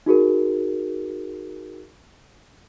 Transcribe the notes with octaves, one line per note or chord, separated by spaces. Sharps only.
D#4 F#4 G#4 A#4